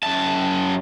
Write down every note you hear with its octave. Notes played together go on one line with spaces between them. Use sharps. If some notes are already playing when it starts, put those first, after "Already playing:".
F#2 A5